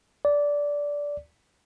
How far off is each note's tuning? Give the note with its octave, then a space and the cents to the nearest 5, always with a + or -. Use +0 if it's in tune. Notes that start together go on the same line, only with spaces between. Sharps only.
D5 -15